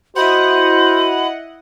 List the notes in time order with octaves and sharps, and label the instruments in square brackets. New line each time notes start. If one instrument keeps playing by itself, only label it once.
[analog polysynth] E4 D#5 F#5 [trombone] F#4 [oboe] C5 [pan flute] B5